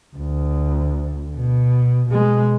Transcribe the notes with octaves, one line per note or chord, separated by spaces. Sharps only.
D2
B2
B2 G#3